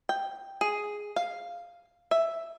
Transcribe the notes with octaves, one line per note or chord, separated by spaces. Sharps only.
G5
G#4
F5
E5